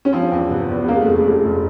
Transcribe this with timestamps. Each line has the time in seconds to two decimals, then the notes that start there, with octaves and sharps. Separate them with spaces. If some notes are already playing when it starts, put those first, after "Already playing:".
0.05 C#4
0.13 F3 C4
0.32 E2
0.50 C3 B3
0.69 E2
0.83 B3
0.88 C#3 A#3
0.96 G#3
1.01 A3
1.07 F1
1.14 G#3
1.25 F2 A3
1.44 F1